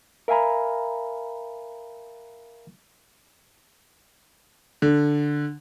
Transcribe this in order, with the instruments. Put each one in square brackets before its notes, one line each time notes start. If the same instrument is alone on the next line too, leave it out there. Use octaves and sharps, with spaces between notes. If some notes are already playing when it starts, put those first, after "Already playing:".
[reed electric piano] A#4 E5 F5 G#5 A#5 B5
[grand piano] D3